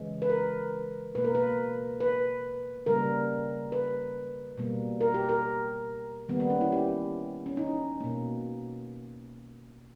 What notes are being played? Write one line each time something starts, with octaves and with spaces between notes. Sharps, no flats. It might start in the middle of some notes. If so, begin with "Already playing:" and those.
Already playing: C#3 E3 G#3
B4
A#4
B2 A#3 B4
A#4
B4
B4
C#3 G3 A#3 A#4
B4
B2 G3 A#3
A#4
G4
A#4
D#3 G3 A#3 B3
B3
C#4
E4
G4
C#4
D#4
B2 A#3